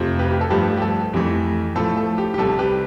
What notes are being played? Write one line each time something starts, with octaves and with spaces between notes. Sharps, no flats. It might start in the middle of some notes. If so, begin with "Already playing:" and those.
Already playing: F2 C3 F3 A3
G4 B4
G4
A4
G2 F3 A3 G4 B4
G4
A4
F2 E3 A3 G4
A2 F3 A3 A4
A4
G4
G4
C2 C3 G3 A4
G4 B4